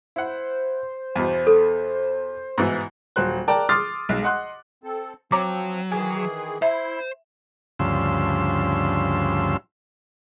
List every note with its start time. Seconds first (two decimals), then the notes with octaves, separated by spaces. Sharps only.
0.16 E4 C5 F#5
1.16 E2 B2
1.47 A4
2.58 G#2 B2 E3
3.16 D#1 F#3 C5 F#6
3.48 A#4 D5 G5 A5 A#5
3.69 C6 D6 D#6 F6 A6 C7
4.09 B1 G#3
4.23 D#5 F#5 C6 F#6
4.84 C4 A4
5.32 F3 F#3 C4 C#5 A#5 D6
5.92 D#3 E3 G#4 G#5
6.62 E4 C5 E5
7.79 D2 G2 C#3 F3 C6 E6